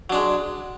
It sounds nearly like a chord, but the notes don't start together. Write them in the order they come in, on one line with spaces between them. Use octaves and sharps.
F#3 D4 G#3